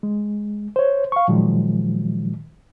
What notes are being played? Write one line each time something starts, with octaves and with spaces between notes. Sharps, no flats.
G#3
C5 C#5
F5 C#6
A#2 D#3 F3 F#3 G#3